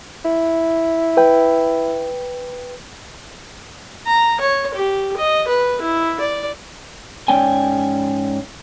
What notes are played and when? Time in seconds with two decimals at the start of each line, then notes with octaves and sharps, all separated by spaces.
0.25 E4
1.17 B4 G5
4.07 A#5
4.40 C#5
4.75 G4
5.17 D#5
5.48 B4
5.81 E4
6.20 D5
7.28 G#2 C#4 D5 G5 G#5